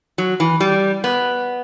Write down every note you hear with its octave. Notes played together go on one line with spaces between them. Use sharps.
F#3
E3
G3
B3